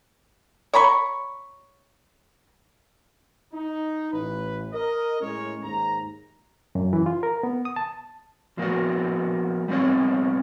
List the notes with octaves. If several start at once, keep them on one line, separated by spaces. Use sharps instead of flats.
C#5 A#5 B5 C#6
D#4
A1 B4
A#4 D#5
A2 G#3 C#4 A#4 C#5
D#2 G#2 G#3 A#5
F#2
E3
F4
A#4
B3
D#6
A5
F3 A#3 B3 F#4
G3 B3 C4 F4 C#5